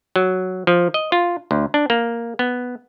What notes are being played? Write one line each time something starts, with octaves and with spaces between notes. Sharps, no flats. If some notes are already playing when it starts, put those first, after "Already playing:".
F#3
F3
D#5
F4
D2
D4
A#3
B3